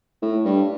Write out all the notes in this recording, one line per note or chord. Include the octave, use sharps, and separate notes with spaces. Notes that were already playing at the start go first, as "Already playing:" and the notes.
A2
G2